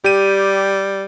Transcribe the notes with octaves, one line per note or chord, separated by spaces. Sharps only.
G3 G4 D#7